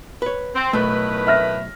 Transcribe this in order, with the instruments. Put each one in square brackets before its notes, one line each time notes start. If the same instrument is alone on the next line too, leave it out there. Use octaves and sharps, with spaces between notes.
[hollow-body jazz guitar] B4 C#5
[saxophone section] C4
[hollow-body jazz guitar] B1 A3 [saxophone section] A2 D#3 B4
[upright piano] E5 F6 A#6